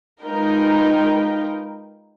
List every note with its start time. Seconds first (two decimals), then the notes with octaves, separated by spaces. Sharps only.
0.23 G#3 D#4 F4 A#4 B4 G5